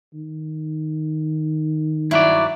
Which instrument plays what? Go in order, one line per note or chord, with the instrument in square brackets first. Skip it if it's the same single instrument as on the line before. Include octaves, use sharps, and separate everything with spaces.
[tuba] D#3
[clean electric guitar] G2 F#3 D5 [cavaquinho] E4